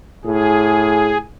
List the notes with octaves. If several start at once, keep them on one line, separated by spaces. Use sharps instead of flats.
A2 G#4